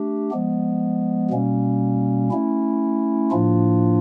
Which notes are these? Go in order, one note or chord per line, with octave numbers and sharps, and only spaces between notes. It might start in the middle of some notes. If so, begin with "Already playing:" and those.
Already playing: A3 D4 G4
F3 G#3 B3
B2 G3 A#3 C#4
A3 C#4 E4
A2 F3 A#3 D4 F4